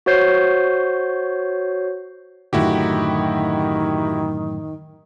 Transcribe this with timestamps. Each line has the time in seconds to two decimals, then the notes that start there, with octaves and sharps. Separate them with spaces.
0.06 F#4 C5 C#5 G6 C7
2.53 F#2 A2 D3 D#3 E4 F#4 G4